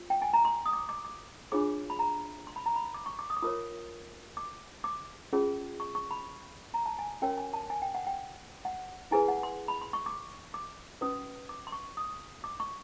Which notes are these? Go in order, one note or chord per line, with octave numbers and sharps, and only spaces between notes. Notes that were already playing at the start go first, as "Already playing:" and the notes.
Already playing: F4
G5
G#5
A#5
C6
D#6
D6
D6
D6
D4 F4 G#4 C#5 D6
B5
A#5
C6
B5
A#5
B5
D6
C#6
D6
D#6
D6
F4 A#4 C#5 D#6
D6
D6
C#4 F4 G#4
C#6
C#6
B5
A#5
A5
G#5
C#4 F#4 A#4 C#5 G5
G#5
A5
G#5
G5
F#5
G5
F#5
E4 G#4 B4 G#5
F#5
C6
B5
C6
C#6
D6
D6
C#4 F#4 B4 D#6
D6
C6
C#6
D#6
D6
C#6